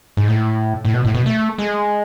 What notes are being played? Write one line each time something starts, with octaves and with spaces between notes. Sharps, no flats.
G#2
A2
A2
B2
A2
B2
A3
G#3